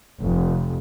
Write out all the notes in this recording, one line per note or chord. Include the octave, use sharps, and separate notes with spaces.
F1